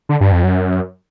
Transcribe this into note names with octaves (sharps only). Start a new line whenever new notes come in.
D3
G2
F2
F#2